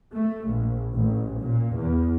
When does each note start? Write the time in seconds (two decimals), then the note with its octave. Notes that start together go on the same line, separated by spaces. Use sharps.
0.12 A3
0.48 A#1
0.93 A1
1.39 A#2
1.77 E2